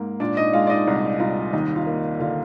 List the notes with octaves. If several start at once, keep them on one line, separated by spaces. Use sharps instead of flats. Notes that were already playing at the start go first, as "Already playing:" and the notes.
Already playing: G#2 A#3
A#2 D4 D5
D#4 D#5
G#3 F4 F5
D5
D#4 D#5
C2
C2 F4 F5
D#2 D#4 D#5
F4 F5
A#3
D3 F4 F5